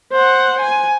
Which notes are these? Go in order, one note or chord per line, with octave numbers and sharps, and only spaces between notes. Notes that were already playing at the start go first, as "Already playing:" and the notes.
C5 F#5
G#5